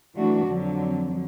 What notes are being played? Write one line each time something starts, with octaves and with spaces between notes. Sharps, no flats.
E3 F#3 A3 D4 F#4
F2 D3 F#3